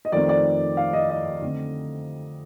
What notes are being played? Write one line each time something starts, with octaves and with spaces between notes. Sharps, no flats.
D#5
F2 D#3 A3 C4 D5
D5
F5
D#5
D#5
D3 A3 C4